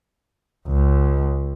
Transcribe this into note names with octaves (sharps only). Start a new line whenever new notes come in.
C#2